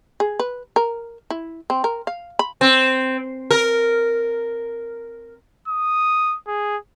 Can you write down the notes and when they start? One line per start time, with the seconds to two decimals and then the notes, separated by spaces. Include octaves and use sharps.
0.20 G#4
0.40 B4
0.76 A#4
1.30 E4
1.70 C4
1.84 A#4
2.07 F5
2.39 B5
2.61 C4
3.51 A#4
5.68 D#6
6.47 G#4